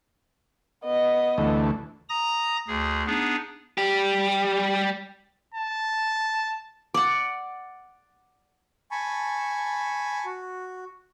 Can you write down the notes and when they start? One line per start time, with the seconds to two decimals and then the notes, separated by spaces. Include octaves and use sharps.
0.85 B3 D#5
1.38 D2 E3 A3
2.09 A#5 D#6 A#6
2.68 D2 G#4
3.07 B3 D4 D#4 G#4
3.78 G3 G4
5.55 A5
6.94 D5 F#5
8.91 G#5 A5 B5 C#6
10.25 F#4